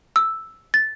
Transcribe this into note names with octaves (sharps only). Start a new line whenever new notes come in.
E6
A6